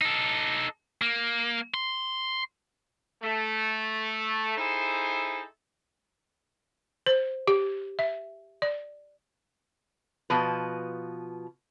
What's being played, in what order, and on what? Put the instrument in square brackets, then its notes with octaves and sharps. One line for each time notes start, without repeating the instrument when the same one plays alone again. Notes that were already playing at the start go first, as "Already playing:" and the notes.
[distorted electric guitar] D#4 A4
A#3
C6
[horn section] A3
D#4 E4 G#4 A4 C5
[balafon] C5
G4
E5
D5
[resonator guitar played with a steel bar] B2 F3 B4